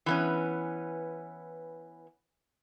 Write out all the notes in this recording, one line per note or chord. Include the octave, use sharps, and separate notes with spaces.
E3 B3 C#4